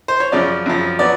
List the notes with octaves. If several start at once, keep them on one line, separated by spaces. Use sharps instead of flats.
C5
C#5
F#2 C#3 F3 D5
F#2 C#3 F3
F#3 B3 D5